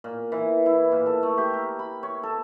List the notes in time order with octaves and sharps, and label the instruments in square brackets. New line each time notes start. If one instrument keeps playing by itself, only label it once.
[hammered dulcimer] A#2
E3
E4
A#2
A4
A3
G4
A#4
B5
C#5
A4